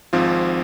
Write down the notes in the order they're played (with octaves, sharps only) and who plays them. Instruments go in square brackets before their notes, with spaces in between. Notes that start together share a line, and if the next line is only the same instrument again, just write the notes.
[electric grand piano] G#1 G#2 F3 C4 F4